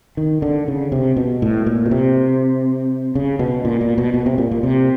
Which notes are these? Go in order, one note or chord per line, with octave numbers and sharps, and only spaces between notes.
D#3
D3
C#3
C3
B2
A2
A#2
B2
C3
C#3
B2
A#2
A#2
B2
B2
C3
A#2
A#2
C3